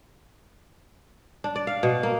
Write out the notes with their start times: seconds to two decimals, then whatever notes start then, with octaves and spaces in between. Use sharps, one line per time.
1.44 D4
1.56 D5
1.67 F5
1.83 B2
2.03 A#3